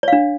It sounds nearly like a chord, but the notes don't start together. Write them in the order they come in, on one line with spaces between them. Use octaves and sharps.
C#5 F5 D4